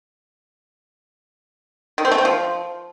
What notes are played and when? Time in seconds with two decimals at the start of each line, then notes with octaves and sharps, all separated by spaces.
1.98 D#3
2.05 C4
2.11 A3
2.18 C4
2.25 F3